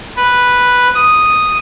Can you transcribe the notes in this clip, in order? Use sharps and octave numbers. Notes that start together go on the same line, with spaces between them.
B4
D#6